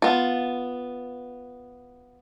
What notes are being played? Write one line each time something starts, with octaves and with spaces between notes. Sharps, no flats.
B3 F4